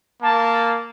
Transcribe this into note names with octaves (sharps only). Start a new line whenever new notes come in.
A#3 A5